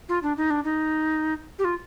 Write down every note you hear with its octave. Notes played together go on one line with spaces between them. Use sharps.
F4
D4
D#4
D4
D#4
G4
F4